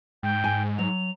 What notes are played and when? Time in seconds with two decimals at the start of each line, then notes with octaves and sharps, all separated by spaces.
0.23 G#2 G5
0.44 G#5
0.79 F#3 F7